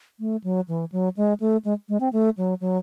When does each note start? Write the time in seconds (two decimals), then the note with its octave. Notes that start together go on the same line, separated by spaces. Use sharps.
0.20 A3
0.44 F#3
0.68 E3
0.92 F#3
1.17 G#3
1.40 A3
1.65 G#3
1.89 G#3
2.00 C4
2.13 A3
2.37 F#3
2.61 F#3